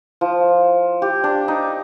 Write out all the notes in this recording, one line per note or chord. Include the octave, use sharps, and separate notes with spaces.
F3
G4
D4
D#4